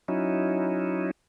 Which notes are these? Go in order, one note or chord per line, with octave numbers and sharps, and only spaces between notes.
F#3 C#4 D#4 E4